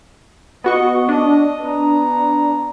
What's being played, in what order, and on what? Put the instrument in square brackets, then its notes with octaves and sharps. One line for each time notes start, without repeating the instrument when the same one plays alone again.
[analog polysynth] B3 F#4 C#6 [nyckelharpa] D#5
[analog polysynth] D4 [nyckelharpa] D#5 D#6
[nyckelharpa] B3 A#5